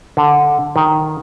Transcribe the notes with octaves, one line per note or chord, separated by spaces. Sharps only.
D3
D#3